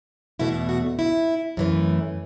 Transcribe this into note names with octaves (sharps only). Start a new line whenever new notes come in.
E2 B2 A3 E4
F#4
E4
F#2 E3 A3